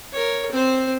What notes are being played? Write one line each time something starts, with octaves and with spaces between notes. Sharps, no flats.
A#4 C#5
C4 C5